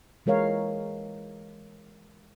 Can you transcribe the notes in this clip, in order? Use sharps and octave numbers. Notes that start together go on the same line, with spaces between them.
E3 G#3 A#4 C#5 F5